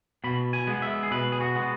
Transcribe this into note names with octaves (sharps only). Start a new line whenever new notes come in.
B2 B5
G#5
G#3 B3
E5
G#4
B2 B4
G#4
F#4
G#3 B3